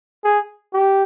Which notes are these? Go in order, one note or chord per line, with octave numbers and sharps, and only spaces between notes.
G#4
G4